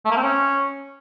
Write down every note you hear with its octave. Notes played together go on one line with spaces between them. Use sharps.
A3
A#3
C4
C#4